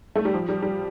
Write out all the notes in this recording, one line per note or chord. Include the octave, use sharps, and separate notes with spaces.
A3
G3
F3
G3
G3